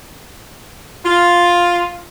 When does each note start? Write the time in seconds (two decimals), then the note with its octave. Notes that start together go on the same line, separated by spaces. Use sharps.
1.06 F4